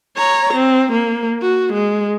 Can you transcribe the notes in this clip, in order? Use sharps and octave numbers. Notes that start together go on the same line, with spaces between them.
C#5 A#5
C4
A#3
F#4
G#3